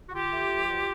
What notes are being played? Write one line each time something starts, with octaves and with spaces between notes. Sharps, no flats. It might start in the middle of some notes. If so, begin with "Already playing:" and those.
F#4
D3 F4 G4
A3
F3
B2